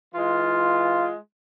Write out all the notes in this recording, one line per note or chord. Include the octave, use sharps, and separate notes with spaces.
E3 G#3 F4